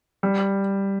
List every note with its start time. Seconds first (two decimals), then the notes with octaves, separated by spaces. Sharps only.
0.23 G3